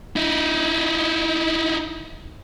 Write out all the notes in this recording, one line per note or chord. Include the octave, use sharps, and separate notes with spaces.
D#4 E4